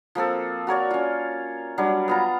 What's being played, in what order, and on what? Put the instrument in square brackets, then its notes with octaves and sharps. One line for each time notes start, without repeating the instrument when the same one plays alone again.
[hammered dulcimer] F3 A#3 C4 A4
F#4 A#4 C#5 D5
C#4 F4
F#3 G3 D4
B3 F4 A#5